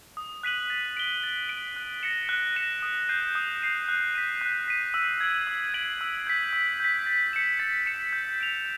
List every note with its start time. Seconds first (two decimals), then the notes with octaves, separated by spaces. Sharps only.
0.17 D#6
0.43 F#6 B6 D#7 F#7
0.70 A6
0.97 D7 G7
1.23 A6
1.49 D7 G7
1.76 F#6
2.03 A#6 C#7 E7
2.29 F#6
2.56 A#6 C#7 E7
2.82 D#6
3.09 G6 C7 D#7
3.35 D#6
3.62 G6 C7 D#7
3.89 F#6
4.15 B6 D#7
4.41 F#6
4.68 B6 D#7
4.94 E6
5.21 G#6 B6 D7 F#7
5.47 E6
5.74 G#6 B6 D7 F#7
6.01 E6
6.27 G6 B6
6.53 E6
6.80 G6 B6
7.06 A6
7.33 C#7 E7
7.59 A6
7.86 C#7 E7
8.13 G6
8.39 B6 D7 F7